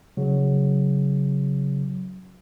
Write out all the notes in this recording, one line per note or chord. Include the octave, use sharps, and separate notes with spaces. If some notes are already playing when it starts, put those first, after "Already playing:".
C#3 F#3